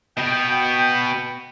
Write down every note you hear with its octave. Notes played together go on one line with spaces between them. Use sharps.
B2 B3 G5